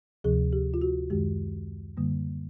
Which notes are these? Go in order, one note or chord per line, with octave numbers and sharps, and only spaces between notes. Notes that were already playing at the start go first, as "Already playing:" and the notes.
D2 C3 F3 G#4
G4
F4
F#4
F#2 D#3 G#3 G4
F#2 D3 G3 A#3